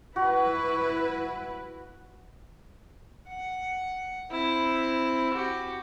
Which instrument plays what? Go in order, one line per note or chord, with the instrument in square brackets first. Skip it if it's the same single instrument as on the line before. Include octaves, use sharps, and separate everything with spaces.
[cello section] E4 B4 [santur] F#4
[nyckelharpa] F#5
C4 E4
F#4 G4